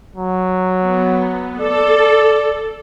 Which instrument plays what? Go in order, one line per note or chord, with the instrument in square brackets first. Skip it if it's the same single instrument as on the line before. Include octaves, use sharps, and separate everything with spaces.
[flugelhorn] F#3
[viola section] B3
[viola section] A4 [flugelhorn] D5